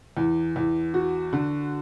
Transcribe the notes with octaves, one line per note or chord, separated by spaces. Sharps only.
E2
E2
F#4
D3